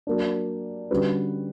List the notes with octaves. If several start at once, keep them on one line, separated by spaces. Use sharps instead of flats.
F#3 A#3 D4
D3 G3 C#4 F#4 B4